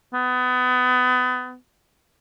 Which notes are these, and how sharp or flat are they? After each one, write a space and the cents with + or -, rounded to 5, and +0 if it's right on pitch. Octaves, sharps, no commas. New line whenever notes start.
B3 +30